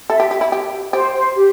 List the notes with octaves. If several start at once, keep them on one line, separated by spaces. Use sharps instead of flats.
A4 E5
G4
G4
E4
G4
G4 C5
C5
G4